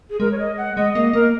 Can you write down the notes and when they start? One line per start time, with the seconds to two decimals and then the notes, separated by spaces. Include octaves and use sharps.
0.10 G#4
0.20 G#3 A#4
0.32 C#5
0.39 D#5
0.57 F#5
0.76 G#3 D#5
0.95 A#3 D#5
1.13 A#3 A#4